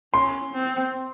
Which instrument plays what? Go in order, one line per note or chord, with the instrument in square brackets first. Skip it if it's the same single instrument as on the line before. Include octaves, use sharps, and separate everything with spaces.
[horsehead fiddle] C#4 [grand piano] C6
[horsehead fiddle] C4